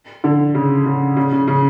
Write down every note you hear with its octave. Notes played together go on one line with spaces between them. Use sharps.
D3
C#3
C#3
C#3
C#3
C#3